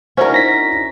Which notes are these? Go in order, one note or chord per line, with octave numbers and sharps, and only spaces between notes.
C#4 D4 E4 F#4 A#4 C5
D#4 A#6 B6